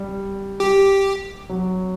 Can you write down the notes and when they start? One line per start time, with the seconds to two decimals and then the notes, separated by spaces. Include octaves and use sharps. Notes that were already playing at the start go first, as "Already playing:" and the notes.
Already playing: G3
0.60 G4
1.49 F#3